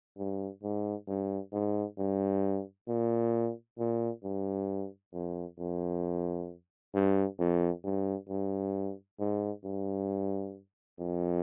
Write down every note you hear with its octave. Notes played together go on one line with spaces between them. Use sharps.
G2
G#2
G2
G#2
G2
A#2
A#2
G2
F2
F2
G2
F2
G2
G2
G#2
G2
F2